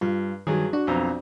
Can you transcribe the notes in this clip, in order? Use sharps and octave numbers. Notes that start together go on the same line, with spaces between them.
G2 F4
G2 D#3 F#3 G#4
D4 F#4
B1 F2 A#5